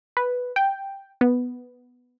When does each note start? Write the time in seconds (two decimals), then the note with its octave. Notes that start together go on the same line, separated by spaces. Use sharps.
0.17 B4
0.56 G5
1.21 B3